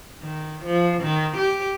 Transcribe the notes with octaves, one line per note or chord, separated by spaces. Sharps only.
D#3
F3
D#3
G4